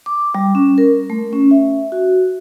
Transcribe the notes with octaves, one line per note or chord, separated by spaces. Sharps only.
D6
G3
C#4
A#4
A3
C#4
E5
F#4